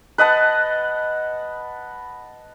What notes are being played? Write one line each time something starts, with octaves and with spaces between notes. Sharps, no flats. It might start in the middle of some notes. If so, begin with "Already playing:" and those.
B4 D#5 F#5 A5